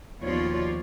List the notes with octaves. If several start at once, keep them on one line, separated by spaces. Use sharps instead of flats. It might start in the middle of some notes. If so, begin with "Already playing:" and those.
D#2 B2 F3 F4 C#5 D5